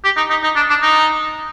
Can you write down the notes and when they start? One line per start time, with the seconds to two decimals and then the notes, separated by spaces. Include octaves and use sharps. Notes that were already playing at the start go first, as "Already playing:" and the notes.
0.04 G4
0.17 D#4
0.30 D#4
0.43 D#4
0.56 D4
0.70 D4
0.82 D#4